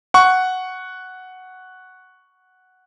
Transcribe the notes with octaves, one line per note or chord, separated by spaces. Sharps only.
F#5 C#6